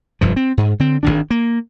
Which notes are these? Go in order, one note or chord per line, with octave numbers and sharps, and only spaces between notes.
F1 G2 F3
C4
G#2
D3 C4
G#1 C#2 D#3 D4
A#3